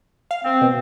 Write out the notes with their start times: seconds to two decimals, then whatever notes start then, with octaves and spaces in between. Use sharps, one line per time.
0.31 F5
0.45 C4
0.62 B2